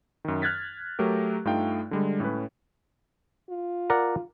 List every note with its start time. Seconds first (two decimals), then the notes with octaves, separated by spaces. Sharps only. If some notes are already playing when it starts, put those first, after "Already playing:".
0.25 F#2 D#3
0.42 F6 F#6 G#6 A6 B6
0.99 F#3 A3 G4 A#4
1.45 G2 A3 D#4 F4 F5 G5
1.91 D3 G3 G#3
2.20 A2 C#4 B4
3.49 F4
3.90 A#4 D5 F#5